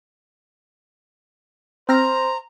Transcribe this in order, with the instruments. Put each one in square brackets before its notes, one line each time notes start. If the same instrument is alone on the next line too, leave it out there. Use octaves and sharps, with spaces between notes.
[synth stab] C4 F6 A#6 [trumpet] C5 [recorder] A#5